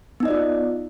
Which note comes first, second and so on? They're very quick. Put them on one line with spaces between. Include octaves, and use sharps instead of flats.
B3 D#4 D#5 D5 F4